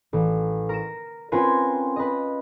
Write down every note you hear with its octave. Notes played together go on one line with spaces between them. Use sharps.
A1
A#4 E7
C4 C#4 F4 A#4 B4 G#5
B4 D#5